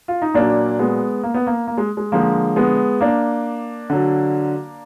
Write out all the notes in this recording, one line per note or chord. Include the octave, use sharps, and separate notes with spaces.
F4
D#4
A#2 F#3 A#3 D4
G#3 B3
A#3
B3
A#3
A#3
G#3
G#3
D3 F3 G#3 A#3
G#3 B3
A#3 D4
D3 F#3